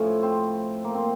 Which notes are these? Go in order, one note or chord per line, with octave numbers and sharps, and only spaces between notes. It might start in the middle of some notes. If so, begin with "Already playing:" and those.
Already playing: A2 F3 C#4
C4
A#3
C4